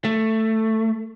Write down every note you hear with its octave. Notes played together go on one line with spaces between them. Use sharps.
A3